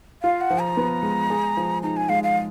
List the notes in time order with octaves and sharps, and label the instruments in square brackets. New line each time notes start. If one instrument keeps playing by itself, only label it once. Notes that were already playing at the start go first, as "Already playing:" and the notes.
[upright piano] F4 [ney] F5
[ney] F#5
[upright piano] F3
[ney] A#5
[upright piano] B3
G#3
G#4
F3
[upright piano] D#4 [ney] A#5
[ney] G#5
[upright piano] G#3 [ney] F5
[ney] F5